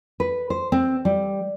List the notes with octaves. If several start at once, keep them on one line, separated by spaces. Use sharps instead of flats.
B4
C5
C4
G3